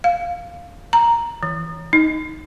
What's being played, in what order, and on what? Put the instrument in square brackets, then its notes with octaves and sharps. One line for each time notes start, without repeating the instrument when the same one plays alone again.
[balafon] F5
A#5
E3
D#4